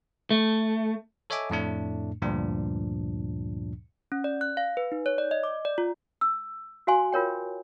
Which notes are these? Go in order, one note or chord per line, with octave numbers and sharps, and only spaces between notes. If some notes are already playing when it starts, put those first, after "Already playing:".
A3
A4 C#5 D#5 E5 G#5 D6
F2 A2 A3 D4
D2 G2 A#2 F3 D4
C#4
D5
F#6
F5
B4
D#4
C#5
D5
D#5
D6
D5
F4
E6
F#4 C5 F5 G#5 C6
F4 A#4 C#5 G5